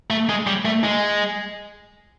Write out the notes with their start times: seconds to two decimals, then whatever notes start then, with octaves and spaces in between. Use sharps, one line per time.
0.10 A3
0.29 G#3
0.47 G3
0.65 A3
0.84 G#3